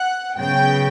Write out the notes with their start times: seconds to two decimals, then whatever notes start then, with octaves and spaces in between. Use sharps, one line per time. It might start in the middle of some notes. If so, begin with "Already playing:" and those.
Already playing: F#5
0.38 C#3 F#3 B3 G5